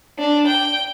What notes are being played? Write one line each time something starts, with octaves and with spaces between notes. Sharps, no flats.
D4
G5